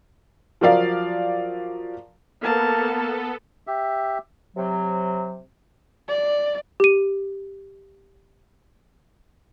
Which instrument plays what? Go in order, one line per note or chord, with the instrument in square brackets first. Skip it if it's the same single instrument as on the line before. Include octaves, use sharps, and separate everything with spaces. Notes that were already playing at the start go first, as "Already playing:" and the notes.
[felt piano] F3 F#3 A#4 D5 F5
[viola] A#3 A5 [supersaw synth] B3 A4
[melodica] G4 E5
[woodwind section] C3 F#3
[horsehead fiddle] D5
[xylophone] G4 D#7